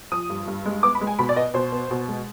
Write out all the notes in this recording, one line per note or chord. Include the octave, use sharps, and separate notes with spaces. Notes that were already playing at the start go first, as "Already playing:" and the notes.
F3 D#6
G2
G2
G#3
B3 D6
B5
G#3
G#5
B2 B5
D5
B3 D#5
B2 C5
B3
B2
G#3